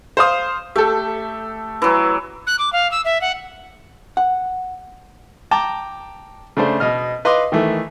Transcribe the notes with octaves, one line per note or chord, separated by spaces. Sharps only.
C5 F5 D#6
A3 G4 A4
E3 F#3
F#6
D6
F5
E6
E5
F#5
F#5
G5 A5 A#5 D6
C#3 A3 D4 C5
B2 D#5 F6
B4 D#5 F5 C6 D6 D#6
D#3 E3 A3